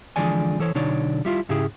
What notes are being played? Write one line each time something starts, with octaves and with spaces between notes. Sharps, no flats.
D3 E3 F3 G#3 D5 G#5
E3 A4 C5 C#5
B1 D3 D#4 C#5 D5
G3 E4 F4
G#2 C#3 E4 G4 G#4